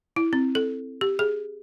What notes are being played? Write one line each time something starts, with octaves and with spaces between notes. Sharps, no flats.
E4
C4
A4
G4
G#4